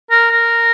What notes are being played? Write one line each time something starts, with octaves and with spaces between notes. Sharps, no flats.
A#4
A#4